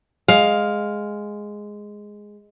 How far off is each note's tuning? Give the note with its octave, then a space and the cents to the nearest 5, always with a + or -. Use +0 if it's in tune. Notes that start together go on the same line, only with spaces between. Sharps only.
G#3 +0 F5 +10